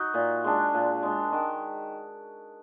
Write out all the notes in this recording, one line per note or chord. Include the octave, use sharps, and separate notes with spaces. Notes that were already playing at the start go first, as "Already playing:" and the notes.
Already playing: D#4 F#4
A#2
G#3 D4
A#2
G#3 D4
D#3